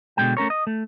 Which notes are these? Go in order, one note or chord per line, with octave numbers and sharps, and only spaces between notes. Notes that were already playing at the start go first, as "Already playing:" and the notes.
B2 D3 F#3 G#3 G5
A3 C#4 A#4 C#5
D#5
A3